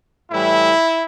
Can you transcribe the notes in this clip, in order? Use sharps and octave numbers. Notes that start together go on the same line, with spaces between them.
A2 E3 G3 E4